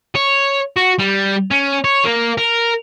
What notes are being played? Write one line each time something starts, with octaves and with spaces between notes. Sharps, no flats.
C#5
F#4
G3
C#4
C#5
A#3
A#4